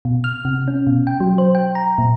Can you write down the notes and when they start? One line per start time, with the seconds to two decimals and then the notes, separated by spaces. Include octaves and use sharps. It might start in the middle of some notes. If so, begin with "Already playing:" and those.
0.05 B2
0.24 F6
0.45 C3
0.68 C#4
0.87 B2
1.07 G5
1.20 F#3
1.38 C5
1.55 G5
1.75 A#5
1.98 A#2